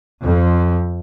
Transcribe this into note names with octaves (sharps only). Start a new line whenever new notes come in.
F2